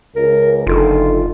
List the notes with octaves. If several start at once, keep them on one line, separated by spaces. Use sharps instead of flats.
C#2 A#4
F#1 D3 D#4 F4 A4